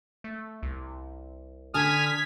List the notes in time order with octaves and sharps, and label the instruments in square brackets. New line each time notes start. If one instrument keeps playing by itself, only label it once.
[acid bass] A3
C2
[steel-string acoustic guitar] D3 D4 G#5 [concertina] D#6 F6 [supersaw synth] G#6 B6